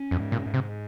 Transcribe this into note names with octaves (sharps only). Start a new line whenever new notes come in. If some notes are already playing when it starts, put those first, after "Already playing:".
Already playing: C#4
F2
G#2
A#2
G#2
C3